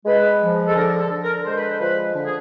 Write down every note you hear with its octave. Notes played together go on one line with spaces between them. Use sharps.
G#3 B4
F3
A4
D3 A#4
A4
D3
A#4
G#3 C5
B4
C5
F3 B4
D3
G#4